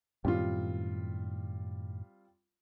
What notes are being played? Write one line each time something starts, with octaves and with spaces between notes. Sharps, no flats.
F#2 A2 D#3 G3 C4 F4